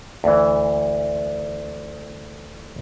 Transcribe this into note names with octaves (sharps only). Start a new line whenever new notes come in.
D2 E3